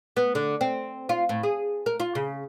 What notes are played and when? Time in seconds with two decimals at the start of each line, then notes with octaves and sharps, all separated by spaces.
0.17 B3
0.35 D3
0.61 C4
1.09 F4
1.29 A2
1.43 G#4
1.86 A#4
2.00 F4
2.15 C#3